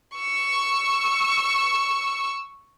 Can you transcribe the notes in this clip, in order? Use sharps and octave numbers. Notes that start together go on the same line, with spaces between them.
C#6 E6